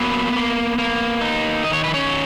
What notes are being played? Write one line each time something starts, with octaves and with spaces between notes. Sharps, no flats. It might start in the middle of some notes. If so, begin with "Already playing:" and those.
Already playing: F#3 A#3 B3 B4
A#3
A#3
D#4
D#3 D#5
C#5
B4
C#4 C#5
F#3